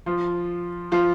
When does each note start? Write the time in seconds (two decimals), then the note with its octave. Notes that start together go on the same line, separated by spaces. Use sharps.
0.06 F3 F4
0.92 F3 F4